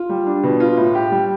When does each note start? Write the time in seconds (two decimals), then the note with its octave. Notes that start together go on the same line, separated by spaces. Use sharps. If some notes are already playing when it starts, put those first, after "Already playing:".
Already playing: F4
0.09 G3
0.26 D4
0.43 B2
0.60 F4
0.77 A2
0.95 G4
1.11 G3